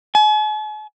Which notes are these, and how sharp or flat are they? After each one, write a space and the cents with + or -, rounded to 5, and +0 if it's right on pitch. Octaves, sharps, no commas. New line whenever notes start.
G#5 +45